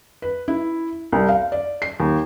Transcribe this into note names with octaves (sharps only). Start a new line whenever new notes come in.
B4
E4
C2
F5
D5
C7
D#2